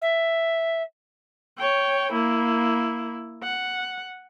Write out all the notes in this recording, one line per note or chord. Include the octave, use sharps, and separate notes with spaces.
E5
C#5 G5
A#3 E4
F#5